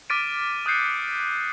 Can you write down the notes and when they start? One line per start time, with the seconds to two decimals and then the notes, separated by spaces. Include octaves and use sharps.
0.10 D6 F6 A6 B6 D7 D#7
0.66 D#6 F#6 G6 C7 C#7